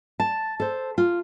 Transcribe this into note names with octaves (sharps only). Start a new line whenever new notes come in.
A5
A4 C5
F4